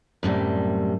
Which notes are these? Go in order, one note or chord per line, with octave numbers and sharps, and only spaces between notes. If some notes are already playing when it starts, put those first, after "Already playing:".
F#2 A2 C3 G3